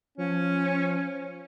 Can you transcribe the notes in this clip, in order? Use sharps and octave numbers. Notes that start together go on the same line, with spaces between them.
F3 C#4